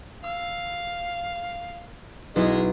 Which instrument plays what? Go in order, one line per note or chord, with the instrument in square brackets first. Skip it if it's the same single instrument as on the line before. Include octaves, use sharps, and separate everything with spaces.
[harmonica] F5 [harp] E6
[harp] B1 E4 [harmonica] G#3 D#5